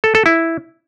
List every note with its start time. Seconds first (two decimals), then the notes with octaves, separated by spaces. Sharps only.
0.04 A4
0.15 A4
0.26 E4